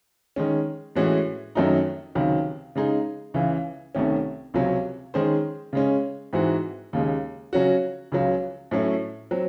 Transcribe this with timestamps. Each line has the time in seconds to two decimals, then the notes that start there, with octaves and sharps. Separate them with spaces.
0.36 D#3 G#3 C#4
0.95 A2 E3 G#3 C#4 F#4
1.55 F#2 D#3 F#3 A3 D#4
2.15 C#2 C3 D#3 F#3
2.75 C#3 G#3 D#4 G#4
3.34 C#2 C#3 E3
3.95 C2 C3 D#3 A3 C#4
4.54 C#2 C3 F#3 C#4
5.14 D#3 G#3 C#4 G#4 C5
5.73 C#3 G#3 C#4
6.33 G#2 E3 C4 F#4
6.93 D#2 C#3 G#3
7.53 C#3 F#3 C#4 F#4
8.12 C#2 C#3 F#3
8.71 A2 F#3 A3 C#4 E4
9.31 F#3 C4